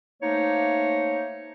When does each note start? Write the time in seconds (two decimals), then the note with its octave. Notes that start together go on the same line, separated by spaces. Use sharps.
0.23 A3 A#3 D#4 C5 C#5